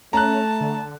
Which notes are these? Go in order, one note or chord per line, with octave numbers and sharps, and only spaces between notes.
A3 C#4 A5 A#5 F#6
D3